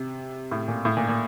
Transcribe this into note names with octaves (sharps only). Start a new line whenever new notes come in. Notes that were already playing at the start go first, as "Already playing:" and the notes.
Already playing: C3
A2
A#2
A2
A#2
A#2